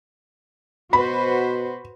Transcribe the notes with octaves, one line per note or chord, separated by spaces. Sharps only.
B2 F#4 B4 C5 B5